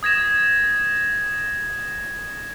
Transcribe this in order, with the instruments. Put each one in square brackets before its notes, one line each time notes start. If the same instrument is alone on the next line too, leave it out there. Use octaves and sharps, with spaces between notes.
[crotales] D#6 G#6 A#6 E7